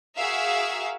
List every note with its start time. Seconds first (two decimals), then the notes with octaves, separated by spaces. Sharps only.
0.16 F#4 G#4 A#4 E5 F5